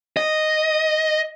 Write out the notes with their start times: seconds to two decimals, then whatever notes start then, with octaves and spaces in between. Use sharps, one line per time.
0.17 D#5